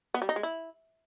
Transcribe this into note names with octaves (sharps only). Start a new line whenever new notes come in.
B3
G3
D#4
G#3
E4